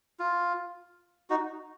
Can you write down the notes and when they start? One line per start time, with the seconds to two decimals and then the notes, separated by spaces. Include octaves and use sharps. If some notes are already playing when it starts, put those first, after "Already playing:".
0.19 F4
1.30 D#4 F#4